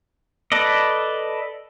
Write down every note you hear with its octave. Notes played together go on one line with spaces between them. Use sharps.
A4 B4 D5 D#5